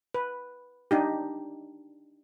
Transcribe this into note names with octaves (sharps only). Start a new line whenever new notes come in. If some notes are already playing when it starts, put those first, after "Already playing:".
B4
D4 D#4 G4